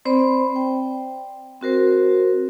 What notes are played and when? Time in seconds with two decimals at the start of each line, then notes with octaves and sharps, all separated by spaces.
0.05 C4 C5 D5 B5
0.56 G5
1.61 C4 F#4 A#4 C5